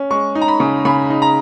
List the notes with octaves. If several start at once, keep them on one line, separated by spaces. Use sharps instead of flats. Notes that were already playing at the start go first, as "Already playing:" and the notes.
Already playing: C#4
G#3 C#6
D#4
A#5
B5
C#3
C#3 B5
D#4
A#5